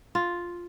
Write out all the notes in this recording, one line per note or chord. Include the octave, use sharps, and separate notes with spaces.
F4